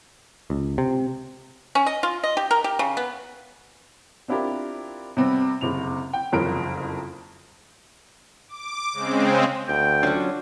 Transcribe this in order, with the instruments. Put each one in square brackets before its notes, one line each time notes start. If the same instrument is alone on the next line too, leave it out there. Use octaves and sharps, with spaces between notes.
[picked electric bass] C#2
C3
[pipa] C#4
D#5
F4
D#5
G4
A#4
G4
C#3
B3
[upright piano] C4 D4 E4 F4 G4 A#4
C3 G3 B3 C4
F#1 C3 F7
G5
F#1 C2 F2 A#4 D7
[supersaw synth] D6
C#3 G#3 C4
[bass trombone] D2 [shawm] G5
[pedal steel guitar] F#3 C#4 F4 [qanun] D4 F#4